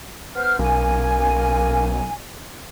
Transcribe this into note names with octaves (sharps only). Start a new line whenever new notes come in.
B3 C5 F6
B1 A#3 C#4 G#5